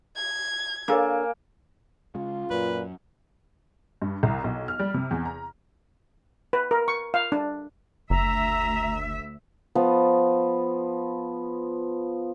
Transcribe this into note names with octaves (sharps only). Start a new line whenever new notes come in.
G#6
A#3 D4 A4 A#4 C#5 F5 G#5
C#3 G#3 F4
F#2 A#2 F#3 B4
G2
C2
B1
F6
G3
C3
E2
A#5
B4
A#4
C#6
F5
D4
F#1 D2 E5 A#5
F3 B3